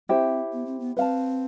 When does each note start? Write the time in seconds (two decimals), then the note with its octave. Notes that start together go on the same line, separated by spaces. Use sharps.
0.09 C4 E4 G4 C5
0.53 B3
0.66 C4
0.80 B3
0.97 C4 B4 F5 A5